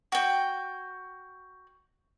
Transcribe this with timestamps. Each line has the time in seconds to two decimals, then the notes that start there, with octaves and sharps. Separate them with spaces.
0.12 F#4 G5